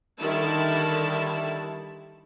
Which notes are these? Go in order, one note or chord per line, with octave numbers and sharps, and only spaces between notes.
D3 D#3 G3 E4 A5